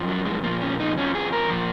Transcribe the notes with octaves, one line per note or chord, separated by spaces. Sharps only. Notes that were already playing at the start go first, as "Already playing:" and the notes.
Already playing: F#2 F3
F#3
G#3
A#2 F3 A#3
C#4
D#4
F2 F3 C#4
G#4
A#4
A#2 F3